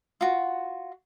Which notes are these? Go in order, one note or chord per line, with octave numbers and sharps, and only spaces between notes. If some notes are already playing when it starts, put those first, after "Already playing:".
F4 F#4